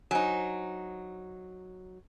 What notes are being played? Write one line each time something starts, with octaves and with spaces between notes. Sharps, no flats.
F#3 D4 D#4 C5